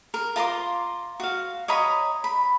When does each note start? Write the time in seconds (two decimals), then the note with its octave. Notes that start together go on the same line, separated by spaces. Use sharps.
0.14 A#4
0.36 F4 A#5 C6 D6
1.20 F#4 F5
1.68 C#5 D#5 A#5 B5
2.24 B5